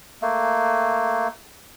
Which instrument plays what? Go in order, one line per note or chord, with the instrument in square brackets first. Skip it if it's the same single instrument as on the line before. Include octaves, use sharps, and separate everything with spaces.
[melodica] A3 A#3